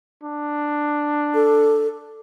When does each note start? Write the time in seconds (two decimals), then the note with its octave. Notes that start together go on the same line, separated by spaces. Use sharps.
0.23 D4
1.34 A4